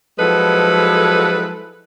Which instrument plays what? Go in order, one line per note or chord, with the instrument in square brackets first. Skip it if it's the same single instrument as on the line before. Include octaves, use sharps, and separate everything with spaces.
[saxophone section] F3 F#3 G#3 E4 A4 B4